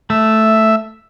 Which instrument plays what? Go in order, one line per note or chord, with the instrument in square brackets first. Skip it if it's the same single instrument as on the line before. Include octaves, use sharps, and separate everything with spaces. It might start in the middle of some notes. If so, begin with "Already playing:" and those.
[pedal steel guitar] A3 [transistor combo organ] E5